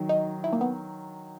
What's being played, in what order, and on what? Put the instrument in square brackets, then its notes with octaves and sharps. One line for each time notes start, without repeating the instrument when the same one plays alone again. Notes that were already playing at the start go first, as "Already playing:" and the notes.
Already playing: [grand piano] D#3 F#3
[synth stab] D#4
E4
A#3
B3